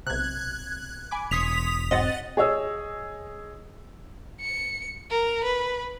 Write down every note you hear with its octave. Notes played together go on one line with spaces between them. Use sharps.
B1 C3 F#6 G#6
G#5 B5 D6
E1 C6 D#6 G#6 B6 C#7 F7
G#2 F#3 C4 D#5 F#5 A6
G#4 C#5 D#5 E6
C#7
A#4
B4